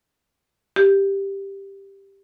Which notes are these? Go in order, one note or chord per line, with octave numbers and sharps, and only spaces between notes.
G4